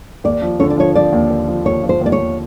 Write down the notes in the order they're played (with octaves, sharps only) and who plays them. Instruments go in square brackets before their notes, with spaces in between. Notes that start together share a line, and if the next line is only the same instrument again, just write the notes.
[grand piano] D#2 [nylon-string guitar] D5
[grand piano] F3
[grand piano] D3 [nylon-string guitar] C#5
[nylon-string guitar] D5
[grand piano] F3 [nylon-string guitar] C#5
[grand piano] F3 [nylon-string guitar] D5
[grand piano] D#2
D#2
F3
[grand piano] D#2 [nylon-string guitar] C#5
[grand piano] F3
[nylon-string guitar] C5
[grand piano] D#2 [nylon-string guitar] D5
[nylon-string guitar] C#5
[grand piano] D#2